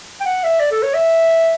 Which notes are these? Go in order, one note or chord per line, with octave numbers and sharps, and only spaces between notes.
G5
F#5
E5
D5
A4
C#5
E5